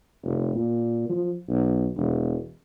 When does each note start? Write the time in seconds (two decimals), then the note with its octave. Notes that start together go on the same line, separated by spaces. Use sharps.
0.23 F1
0.55 A#2
1.09 F3
1.49 B1
1.96 E1